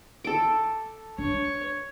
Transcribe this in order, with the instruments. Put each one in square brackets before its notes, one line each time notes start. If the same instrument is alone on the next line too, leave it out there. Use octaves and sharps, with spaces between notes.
[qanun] A4 D6
[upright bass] D4 [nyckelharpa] C#5